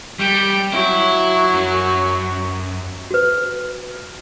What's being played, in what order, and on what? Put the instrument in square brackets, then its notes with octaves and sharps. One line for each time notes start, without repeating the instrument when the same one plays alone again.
[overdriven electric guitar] G3 [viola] G5
[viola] F#3 [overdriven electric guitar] E4
[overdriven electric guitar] F#2
[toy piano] F#4 B4